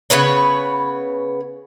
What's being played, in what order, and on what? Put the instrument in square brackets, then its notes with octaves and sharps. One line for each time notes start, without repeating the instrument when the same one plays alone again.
[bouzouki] C#3 B3 B4 C#5